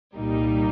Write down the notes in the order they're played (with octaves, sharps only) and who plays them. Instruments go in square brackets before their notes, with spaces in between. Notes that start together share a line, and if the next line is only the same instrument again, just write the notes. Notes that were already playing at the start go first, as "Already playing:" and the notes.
[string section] C2 A#2 G3 A#3 D#4